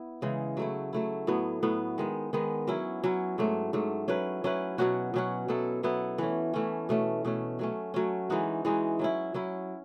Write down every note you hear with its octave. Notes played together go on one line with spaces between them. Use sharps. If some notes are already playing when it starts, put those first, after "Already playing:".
Already playing: B3 E4
C#3 E3 G#3
F#3 A3 E4
F#3 A3 E4
A2 F#3 B3
A2 F#3 B3
D#3 G#3 B3
D#3 G#3 B3
F#3 C#4 E4
F#3 C#4 E4
G#2 F#3 A3
G#2 F#3 A3
F#3 C#4 E4 B4
F#3 C#4 E4 B4
B2 F#3 C#4 F#4
B2 F#3 C#4 F#4
F#3 B3 E4 A4
F#3 B3 E4 A4
E3 A3 C#4
E3 A3 C#4
B2 A3 C#4
B2 A3 C#4
F#3 A3 C#4
F#3 A3 C#4
E3 G#3 D#4 F#4
E3 G#3 D#4 F#4
F#3 C#4 E4
F#3 C#4 E4